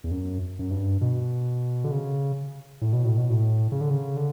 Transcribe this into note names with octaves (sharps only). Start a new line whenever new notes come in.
E2
F#2
F#2
G2
B2
D3
C#3
A2
B2
A2
B2
A2
C#3
D3
C#3
D3